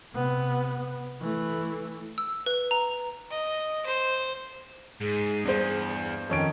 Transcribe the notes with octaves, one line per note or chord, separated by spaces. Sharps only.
C3 B3
E3 A3
E6
B4
A#5
D#5
C5
G#2 G#4
E2 G2 C5
F2 D#3 C#4 D7